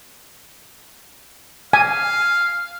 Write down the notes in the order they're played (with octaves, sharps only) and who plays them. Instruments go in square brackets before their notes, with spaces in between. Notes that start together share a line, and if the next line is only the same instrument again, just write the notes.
[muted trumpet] F5 [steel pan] G#5